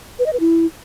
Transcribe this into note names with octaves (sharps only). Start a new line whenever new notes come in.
B4
D#5
B4
E4